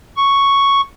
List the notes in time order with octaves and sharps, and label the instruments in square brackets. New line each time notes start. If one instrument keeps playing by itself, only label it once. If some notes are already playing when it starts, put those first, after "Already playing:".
[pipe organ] C#6